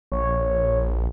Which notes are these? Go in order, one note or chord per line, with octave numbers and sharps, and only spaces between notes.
A#1 C#5